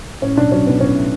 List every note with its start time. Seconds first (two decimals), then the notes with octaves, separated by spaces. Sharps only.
0.22 A2 C#4
0.37 B1 D4
0.52 F#3 C#4
0.66 B1 B3
0.80 A2 C#4
0.95 A2